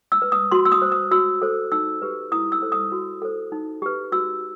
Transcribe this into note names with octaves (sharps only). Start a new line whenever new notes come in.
E6
B4
D#6
F#4 C6
E6
D#6
C5
D#6
F#4 E6
A4 C5
D#4 E6
G4 B4
E4 D#6
E6
A4 C5
D#6
F#4
A4 C5
D#4
G4 B4
F#4 E6